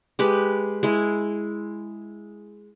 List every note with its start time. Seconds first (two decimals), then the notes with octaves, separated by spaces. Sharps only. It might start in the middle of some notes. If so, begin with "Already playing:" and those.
0.19 G#3 G4 B4
0.83 G#3 E4